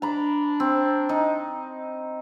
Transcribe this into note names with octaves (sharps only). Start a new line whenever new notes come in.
D4 A#5 B5
C4
D#4